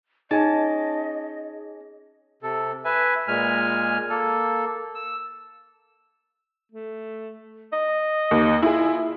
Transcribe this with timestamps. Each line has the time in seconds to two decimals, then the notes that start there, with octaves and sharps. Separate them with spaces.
0.31 C#4 D#4 G#4 D#5 A5
2.43 C3 A4
2.85 B4 E5 G#5
3.28 A#2 G#3 G#5 F6
4.10 A#3 A4
4.95 E6
6.72 A3
7.73 D#5
8.31 D#2
8.62 E4 F4 G#4